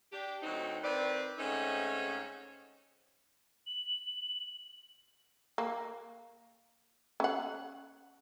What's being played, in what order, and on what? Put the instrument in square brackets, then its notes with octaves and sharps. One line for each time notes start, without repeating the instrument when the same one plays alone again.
[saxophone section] D4 G4
D2 F#3 C4 D#4
D#3 C4 B4 D5
G#2 A3 C4 C#4 D#4
[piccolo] F#7
[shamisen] A#3
C#4 F#5